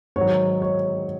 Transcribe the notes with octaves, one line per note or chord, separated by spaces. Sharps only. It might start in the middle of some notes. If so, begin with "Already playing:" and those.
G#2 D#3 F#3 C#5
C#5